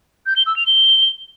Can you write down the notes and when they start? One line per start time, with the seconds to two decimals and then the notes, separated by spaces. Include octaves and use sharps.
0.26 G6
0.36 G7
0.46 E6
0.56 F7
0.67 G7